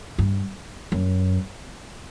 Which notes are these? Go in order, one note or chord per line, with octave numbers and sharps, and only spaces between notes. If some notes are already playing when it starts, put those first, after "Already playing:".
G2
F#2